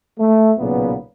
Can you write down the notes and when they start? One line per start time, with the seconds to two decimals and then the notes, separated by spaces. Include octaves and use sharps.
0.19 A3
0.58 B1 A#2 C#3 A#3 B3